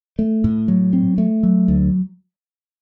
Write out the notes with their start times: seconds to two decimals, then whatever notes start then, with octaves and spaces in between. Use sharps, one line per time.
0.19 A3
0.44 A2
0.68 F#3
0.93 C4
1.18 A3
1.43 F#3
1.68 D2